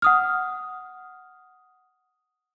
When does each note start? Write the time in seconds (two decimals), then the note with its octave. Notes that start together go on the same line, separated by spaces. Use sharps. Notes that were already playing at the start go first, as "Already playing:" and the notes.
0.02 F#5 D#6 F6